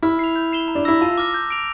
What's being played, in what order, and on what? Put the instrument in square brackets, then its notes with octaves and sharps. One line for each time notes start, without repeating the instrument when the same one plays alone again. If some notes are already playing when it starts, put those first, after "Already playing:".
[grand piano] E4 [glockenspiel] F6
[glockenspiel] C7 F7
G6
C7 E7 G7
A#5
[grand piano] D4
[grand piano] E4 [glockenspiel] E6 A#6
[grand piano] F4 [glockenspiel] A5
[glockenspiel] D6 F6 A#6
G6
D7 F7